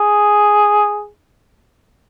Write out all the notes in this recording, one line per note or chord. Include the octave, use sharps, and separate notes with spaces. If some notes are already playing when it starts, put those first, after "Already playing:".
Already playing: G#4